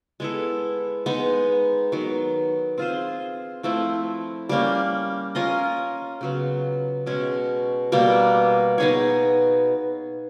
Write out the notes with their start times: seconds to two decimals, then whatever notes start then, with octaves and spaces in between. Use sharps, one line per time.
0.20 G#3 B3 E4 A4
1.06 G#3 B3 D#4
1.92 D#3 F#3 B3
2.78 C4 F4 G#4 C5
3.63 F3 A3 C4 E4
4.49 G3 A#3 C#4
5.35 C#4 F4 A#4 D#5
6.21 C#3 F#3 B3
7.07 B2 G#3 C#4
7.92 B2 G3 A#3
8.78 B3 D#4 G#4 C#5